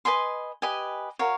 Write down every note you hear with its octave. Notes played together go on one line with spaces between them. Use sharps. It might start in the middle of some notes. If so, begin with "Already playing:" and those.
B4 D#5 G#5 C6
G4 B4 D#5 G#5
F#4 A#4 C#5 F5